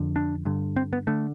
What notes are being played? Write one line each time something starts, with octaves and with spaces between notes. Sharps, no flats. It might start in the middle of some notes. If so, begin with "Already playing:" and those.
Already playing: F2 D3
D4
G2 D3
C4
B3
D3 A3